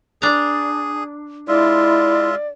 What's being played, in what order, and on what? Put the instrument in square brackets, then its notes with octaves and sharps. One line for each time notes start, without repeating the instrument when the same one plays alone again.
[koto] D4 A#5 [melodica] G#4
[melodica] G#3 F4 E5 [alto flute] E4 [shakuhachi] D5